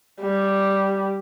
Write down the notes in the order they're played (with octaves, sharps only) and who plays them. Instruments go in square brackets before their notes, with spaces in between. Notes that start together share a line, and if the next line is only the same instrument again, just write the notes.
[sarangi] G3